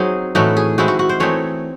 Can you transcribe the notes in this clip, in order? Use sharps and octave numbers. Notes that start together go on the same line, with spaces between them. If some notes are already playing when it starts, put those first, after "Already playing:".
Already playing: F#3 C4 D#4 G#4
A2 E3 A3 D#4 F#4
G#4
D#3 G#3 C4 E4 F#4
F#4
F#4
C5
E3 A3 C4 D#4 C#5